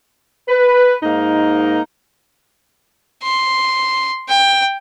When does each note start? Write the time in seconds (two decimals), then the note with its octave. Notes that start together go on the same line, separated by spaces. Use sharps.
0.48 B4
1.03 G#2 A#3 D#4 A#4
3.23 C6
4.29 G5